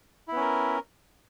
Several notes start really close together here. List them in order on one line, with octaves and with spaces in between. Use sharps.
E4 B3 C#4 A#4